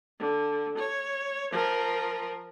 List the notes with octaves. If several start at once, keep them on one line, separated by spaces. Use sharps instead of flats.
D3
C#5
F3 A#4